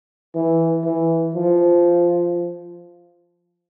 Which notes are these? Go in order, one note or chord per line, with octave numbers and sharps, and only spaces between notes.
E3
E3
F3